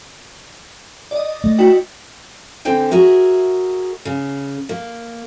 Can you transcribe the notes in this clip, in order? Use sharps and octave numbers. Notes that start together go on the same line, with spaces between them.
D5 D#5
A3
E4 F#4 G5
D3 C4 G5 G#5
F#4 G#4 A#4 E5
C#3
A#3